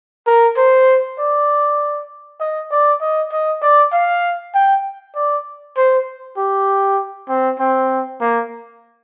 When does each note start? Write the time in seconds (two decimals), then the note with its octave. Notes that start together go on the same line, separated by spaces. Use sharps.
0.27 A#4
0.57 C5
1.19 D5
2.40 D#5
2.71 D5
3.01 D#5
3.32 D#5
3.62 D5
3.93 F5
4.54 G5
5.15 D5
5.77 C5
6.37 G4
7.29 C4
7.59 C4
8.20 A#3